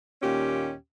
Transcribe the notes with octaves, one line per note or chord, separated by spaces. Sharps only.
D#2 A#2 C#4 G4